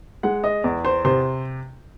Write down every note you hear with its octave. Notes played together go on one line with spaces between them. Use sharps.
G#3 F#5
D#5
E2
C5
C3 C5